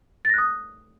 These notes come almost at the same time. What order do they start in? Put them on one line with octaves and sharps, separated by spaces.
A6 A#6 F#6 D#6